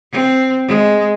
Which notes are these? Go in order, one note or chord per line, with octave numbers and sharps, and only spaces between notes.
C4
G#3